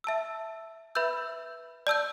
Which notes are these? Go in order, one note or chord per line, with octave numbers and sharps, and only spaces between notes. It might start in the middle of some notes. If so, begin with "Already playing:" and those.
E5 A5 E6
B4 E5 B5 E6 G6
D5 A5 E6 G6